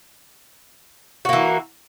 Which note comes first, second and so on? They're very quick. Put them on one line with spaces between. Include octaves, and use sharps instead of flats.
F#4 A#3 E3